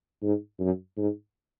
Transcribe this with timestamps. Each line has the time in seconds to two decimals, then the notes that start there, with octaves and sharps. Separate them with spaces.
0.22 G#2
0.59 F#2
0.97 G#2